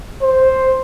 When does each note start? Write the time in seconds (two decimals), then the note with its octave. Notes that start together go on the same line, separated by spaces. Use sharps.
0.22 C5